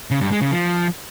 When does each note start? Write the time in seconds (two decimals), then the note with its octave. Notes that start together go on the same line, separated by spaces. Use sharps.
0.11 C#3
0.21 G2
0.31 G#3
0.41 C#3
0.52 F3